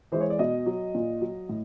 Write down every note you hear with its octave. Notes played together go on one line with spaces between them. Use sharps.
E3 G#3 C5
C#5
D5
B2 D#5
F#3
A#2
F#3
A2